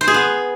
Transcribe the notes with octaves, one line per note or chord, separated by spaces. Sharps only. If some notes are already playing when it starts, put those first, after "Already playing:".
C5
G#4
B3